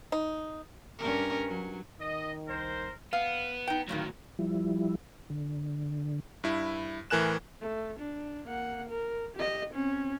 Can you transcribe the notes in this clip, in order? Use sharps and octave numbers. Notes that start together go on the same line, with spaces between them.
D#4
G2 C#4 A#4
F#3
D#3 D#5
C2 A#4 C5
B3 F5
D#4 G5
D2 G2 A#2 D#3 F#3
F3 G3 E4
D3
G2 E4
A2 E3 A#4 G#5 F#6 E7
A3
D4
A#3 F#5
A#4
G4 D#5
C4 C#4